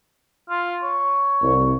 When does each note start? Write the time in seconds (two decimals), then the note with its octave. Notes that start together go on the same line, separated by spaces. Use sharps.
0.50 F4
0.83 C#5
1.41 C2